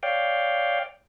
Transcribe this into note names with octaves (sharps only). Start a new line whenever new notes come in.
C#5 D5 F5 G5